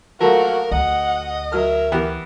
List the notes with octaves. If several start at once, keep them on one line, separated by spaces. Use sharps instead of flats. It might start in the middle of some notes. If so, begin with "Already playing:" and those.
F3 F#3 A3 A#3 F#4 A#4
D2 D#5 F#5
F#3 A#4 E5 F6
E3 B3 G4